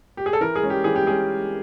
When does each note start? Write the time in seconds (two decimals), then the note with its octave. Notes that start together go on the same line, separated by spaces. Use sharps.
0.17 G4
0.26 G#4
0.33 A4
0.41 E3 A#4
0.55 G#4
0.62 G#3 C#4
0.70 G4
0.84 E3 G#4
0.95 G4
1.07 G#3 C#4 G#4